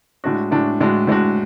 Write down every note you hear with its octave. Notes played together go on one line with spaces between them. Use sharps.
A2 G#3 D4 F#4
A2 G#3 D4 F#4
A2 G#3 D4 F#4
A2 G#3 D4 F#4